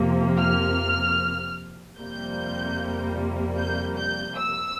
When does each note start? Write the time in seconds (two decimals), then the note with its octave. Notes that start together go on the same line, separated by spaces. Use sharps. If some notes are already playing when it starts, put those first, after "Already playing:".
Already playing: F2 C3 F3 A#3
0.39 F6
1.98 F2 C3 G3 A#3 G6
3.57 G6
3.97 G6
4.37 E6